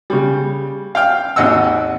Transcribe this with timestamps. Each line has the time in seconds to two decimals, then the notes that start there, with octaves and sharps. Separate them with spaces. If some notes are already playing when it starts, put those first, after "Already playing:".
0.10 C#3 G3
0.95 F5 G5 F6
1.36 G#1 D#2 D#5 F#5 E6